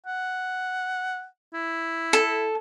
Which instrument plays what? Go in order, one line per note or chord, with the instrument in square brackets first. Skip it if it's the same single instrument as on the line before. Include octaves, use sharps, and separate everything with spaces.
[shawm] F#5
E4
[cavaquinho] A4